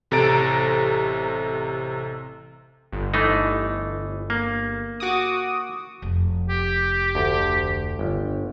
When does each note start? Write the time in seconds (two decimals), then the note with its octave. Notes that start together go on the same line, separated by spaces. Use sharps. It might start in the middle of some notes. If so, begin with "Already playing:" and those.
0.11 A1 C3 A4 A#5 A6 D7
2.92 G1
3.14 E3 A3 D#4
4.30 A#3
5.00 F#4 D6 D#6
6.02 F1
6.50 G4
7.15 D2
7.99 G1